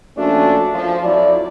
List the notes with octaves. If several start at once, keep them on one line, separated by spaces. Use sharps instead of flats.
F3 A3 A#3 C#4 D4 F#4
F3
F2 F#3 E4 D5